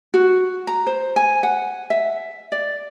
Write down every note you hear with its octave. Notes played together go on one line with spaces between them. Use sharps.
F#4
A#5
C5
G#5
F#5
E5
D5